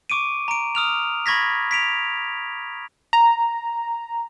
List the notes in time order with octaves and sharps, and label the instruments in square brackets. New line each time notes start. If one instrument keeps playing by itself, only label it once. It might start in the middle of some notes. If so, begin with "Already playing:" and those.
[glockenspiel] C#6 D6 D7 D#7
A#5 D7
D#6 F6 F7
B5 C#6 G#6 A#6 B6
B6 D7 F7
[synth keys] A#5